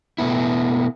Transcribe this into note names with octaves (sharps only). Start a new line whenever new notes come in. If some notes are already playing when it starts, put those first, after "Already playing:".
B2 A3 B3 E4